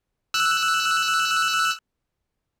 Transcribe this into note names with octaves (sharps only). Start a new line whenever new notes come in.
E6 F#6